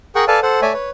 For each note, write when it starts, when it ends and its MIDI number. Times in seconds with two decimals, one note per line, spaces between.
0.15 0.25 68
0.15 0.25 70
0.15 0.25 78
0.15 0.25 79
0.15 0.25 85
0.28 0.40 69
0.28 0.40 71
0.28 0.40 74
0.28 0.40 77
0.28 0.40 80
0.28 0.40 81
0.43 0.61 69
0.43 0.61 72
0.43 0.61 78
0.62 0.73 57
0.62 0.73 73
0.62 0.73 74
0.62 0.73 76
0.62 0.73 80
0.73 0.90 71
0.73 0.90 73